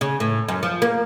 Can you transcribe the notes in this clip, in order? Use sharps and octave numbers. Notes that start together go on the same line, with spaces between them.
C#3
A2
F#2
F3
A#3